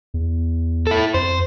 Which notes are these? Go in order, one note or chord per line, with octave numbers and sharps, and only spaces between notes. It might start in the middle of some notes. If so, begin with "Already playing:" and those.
E2
E4 A4
F2 C5